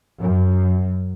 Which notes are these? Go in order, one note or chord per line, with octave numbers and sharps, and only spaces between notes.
F#2